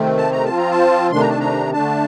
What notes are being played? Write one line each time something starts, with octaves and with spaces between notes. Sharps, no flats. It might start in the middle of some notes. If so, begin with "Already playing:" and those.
Already playing: C3 D#3 A3 C4
A5
A#5
F3 C4 F4 A5
A#5
A5
C3 D#3 A3 D4 C6
A#5
A5
A#5
D3 A3 D4 A5